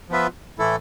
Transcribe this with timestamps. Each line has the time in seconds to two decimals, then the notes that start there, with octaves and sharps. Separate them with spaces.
0.10 F3 B3 F4 B4 E5
0.59 A2 E3 A3 E4 A4